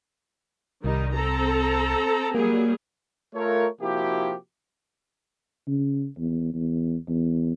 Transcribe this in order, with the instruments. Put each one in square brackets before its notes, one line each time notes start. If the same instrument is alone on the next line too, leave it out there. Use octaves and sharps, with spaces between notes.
[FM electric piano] C2 [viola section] D#3 G3 D#4
[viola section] C4 A4 A#5
[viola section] F#3 G3 G#4 [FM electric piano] A#3
[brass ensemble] A3 F4 A#4 C#5
C3 F3 A#3 E4 F#4 G4
[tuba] C#3
E2
E2
E2